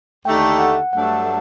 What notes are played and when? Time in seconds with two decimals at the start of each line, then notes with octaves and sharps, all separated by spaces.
0.25 D#2 D3 A3 D#4 G4 G5
0.59 F#5
0.93 G2 F#3 A3 D4 F#5